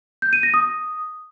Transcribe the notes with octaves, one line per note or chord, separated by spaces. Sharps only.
G6
D#7
A#6
D#6